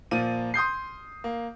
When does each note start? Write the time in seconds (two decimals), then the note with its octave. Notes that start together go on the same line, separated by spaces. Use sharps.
0.11 A#2 F3 A#3 D#7
0.54 C6 D#6 G6 C7
1.24 A#3